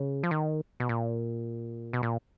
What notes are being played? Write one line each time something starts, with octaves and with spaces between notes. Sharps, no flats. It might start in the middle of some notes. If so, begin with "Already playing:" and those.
Already playing: C#3
F3
D#3
B2
A#2
B2
A#2